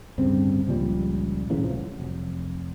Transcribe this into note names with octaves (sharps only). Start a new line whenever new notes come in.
D1 G2 C#3 C4
C#2 A#2 F3 G3
F#2 A2 C#3 E3
C2 F3
F#3
F1